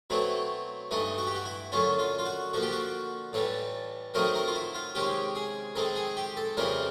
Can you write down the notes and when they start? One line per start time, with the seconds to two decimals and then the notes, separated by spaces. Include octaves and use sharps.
0.10 B2 F#3 A3 C4 E4
0.91 G2 E3 A3 D#4
1.18 F#4
1.27 G4
1.35 F#4
1.46 E4
1.72 F#2 D3 F#3 A3 C#4 F4
1.99 F4
2.19 F4
2.25 F#4
2.53 D3 F3 A#3 F#4
2.62 G4
2.72 F#4
3.33 A2 E3 G3 A4
4.14 D#3 F#3 A3 C4 D#4 A#4
4.35 A#4
4.47 F4
4.55 E4
4.75 F4
4.95 C3 D#3 G#3 C#4 G4
5.35 G#4
5.76 D#3 G#3 C4 D#4 A4
5.96 G#4
6.17 G4
6.37 A4
6.57 F2 C#3 E3 G3 C4 A#4